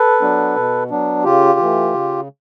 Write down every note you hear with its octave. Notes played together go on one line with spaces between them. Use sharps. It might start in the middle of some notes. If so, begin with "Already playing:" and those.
Already playing: A4 B4
F#3 B3 D4
B2
F#3 B3 D4
C#3 F4 G4
E3 A3
C#3